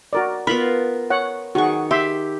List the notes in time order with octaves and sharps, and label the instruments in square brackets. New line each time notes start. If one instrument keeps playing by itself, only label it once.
[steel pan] F#4 A#4 D5
[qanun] B3 F4 A#4 [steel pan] B5
[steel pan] C#5 F#5
[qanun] D#3 C#6 [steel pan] F#4 G#4 F#5
[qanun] G4 [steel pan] E5 C6